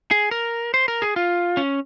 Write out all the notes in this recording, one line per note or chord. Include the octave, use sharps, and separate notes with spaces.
G#4
A#4
C5
A#4
G#4
F4
C#4